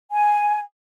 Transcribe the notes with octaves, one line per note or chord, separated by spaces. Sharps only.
G#5